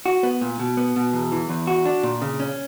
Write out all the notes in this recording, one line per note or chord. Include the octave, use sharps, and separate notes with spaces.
F#4
B3
A#2
B2
B3
B2
E2
E3
E2
F#4
D4
A#2
C#3
C#4